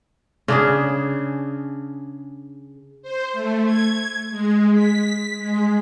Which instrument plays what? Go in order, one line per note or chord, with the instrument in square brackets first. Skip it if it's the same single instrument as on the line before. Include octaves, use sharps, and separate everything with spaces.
[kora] C#3 D4 G#4
[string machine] C5
A3
G#6
G#3
B6
G#3